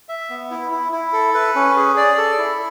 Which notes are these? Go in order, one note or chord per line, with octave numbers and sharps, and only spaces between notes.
E5
B3
E4
E4
E4
A4
B4
C#4
G#4
D5
A4
E4